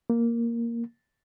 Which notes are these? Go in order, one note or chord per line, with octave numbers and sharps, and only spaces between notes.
A#3